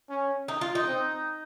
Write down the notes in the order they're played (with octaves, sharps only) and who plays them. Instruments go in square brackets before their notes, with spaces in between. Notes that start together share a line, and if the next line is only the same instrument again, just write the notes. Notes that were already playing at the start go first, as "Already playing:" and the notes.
[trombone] C#4
[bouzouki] D#4
F4
D#4
[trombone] C4